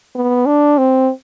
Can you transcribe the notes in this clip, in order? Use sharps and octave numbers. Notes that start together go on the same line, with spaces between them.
B3
D4
C4